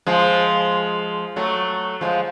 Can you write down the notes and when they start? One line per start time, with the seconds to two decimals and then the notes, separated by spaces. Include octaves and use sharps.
0.06 F3 G#3
1.36 F#3 A3
2.01 F3 G#3